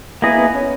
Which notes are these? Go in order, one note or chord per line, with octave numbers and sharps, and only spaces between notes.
A#3 B3 E4 G#4 D#5
B3
C#4